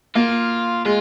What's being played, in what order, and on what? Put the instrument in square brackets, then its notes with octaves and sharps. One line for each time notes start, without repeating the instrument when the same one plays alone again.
[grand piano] A#3 [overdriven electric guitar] F4
[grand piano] G#3 [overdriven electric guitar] F4